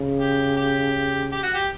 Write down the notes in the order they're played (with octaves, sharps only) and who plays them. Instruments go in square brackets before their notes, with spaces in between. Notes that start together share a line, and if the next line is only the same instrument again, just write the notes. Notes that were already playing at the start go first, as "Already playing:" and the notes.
Already playing: [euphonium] C#3
[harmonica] G4
G4
G4
F#4
G4